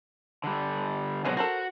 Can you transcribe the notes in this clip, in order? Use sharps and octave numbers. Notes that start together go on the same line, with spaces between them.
D3 G3
B2 D3 F3 F#3 G#3 F#4
F#4 A4 A#4 C5